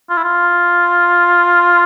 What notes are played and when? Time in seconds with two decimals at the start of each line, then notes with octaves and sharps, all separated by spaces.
0.10 F4
0.17 E4
0.24 F4